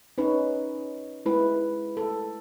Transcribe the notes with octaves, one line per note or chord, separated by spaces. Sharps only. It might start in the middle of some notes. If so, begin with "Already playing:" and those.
C#4 D#4 B4 C#5
G#3 E4 B4
A4